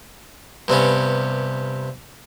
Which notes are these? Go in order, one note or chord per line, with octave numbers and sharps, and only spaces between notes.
G2 C3 B3 C#4